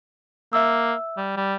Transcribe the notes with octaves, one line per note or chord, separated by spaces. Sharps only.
A#3 E5 E6
G3
G3